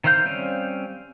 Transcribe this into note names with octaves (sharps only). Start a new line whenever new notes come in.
D#3 E3 C5 F5 G6
G3 C4 C#4 F5